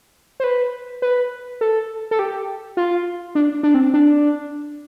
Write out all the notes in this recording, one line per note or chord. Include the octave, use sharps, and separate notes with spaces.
C5
B4
B4
A4
A4
G4
F4
D4
D4
C4
D4